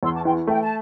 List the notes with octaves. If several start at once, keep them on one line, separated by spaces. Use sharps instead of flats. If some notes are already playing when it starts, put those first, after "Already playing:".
E2 C6 E6
A5 D6
E3 G5 C6
A3 G5
A5